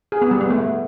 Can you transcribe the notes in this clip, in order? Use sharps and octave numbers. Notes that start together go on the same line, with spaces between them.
G#4
B3
G3
B3
A3